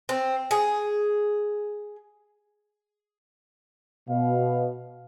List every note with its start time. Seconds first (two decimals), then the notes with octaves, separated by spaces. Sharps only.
0.09 C4
0.51 G#4
4.09 B2 F5